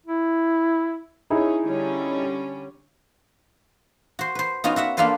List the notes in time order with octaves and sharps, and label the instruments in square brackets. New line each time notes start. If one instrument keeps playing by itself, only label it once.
[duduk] E4
[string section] C#4 [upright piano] D#4 E4 G#4
[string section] D3 G3 C#4
[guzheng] F#4 C5
B4 C5
B3 C#4 D#4 F4 F#4
F#4 E5 F#5
A#3 D4 F4 A4 B4 C5